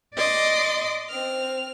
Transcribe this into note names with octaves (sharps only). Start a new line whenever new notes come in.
D5 D#5 C6 D6
C4 F6